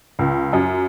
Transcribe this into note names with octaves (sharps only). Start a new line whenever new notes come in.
C#2
F#2